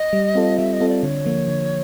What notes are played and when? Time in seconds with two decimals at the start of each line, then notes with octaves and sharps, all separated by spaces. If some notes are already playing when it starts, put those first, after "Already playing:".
Already playing: D#5
0.13 G3
0.35 C4 F4 A4
0.58 G3 E5
0.73 D#5
0.80 C4 F4 A4
0.88 D5
1.03 D3 C#5
1.26 F3 A#3
1.48 D3